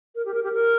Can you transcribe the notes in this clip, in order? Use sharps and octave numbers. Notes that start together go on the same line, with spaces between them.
A#4
G4
A#4
G4
A#4